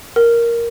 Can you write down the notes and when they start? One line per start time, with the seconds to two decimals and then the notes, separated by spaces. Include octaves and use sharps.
0.16 A#4